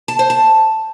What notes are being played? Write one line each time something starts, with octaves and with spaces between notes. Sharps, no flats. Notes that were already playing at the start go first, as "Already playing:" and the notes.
A5
C5
A5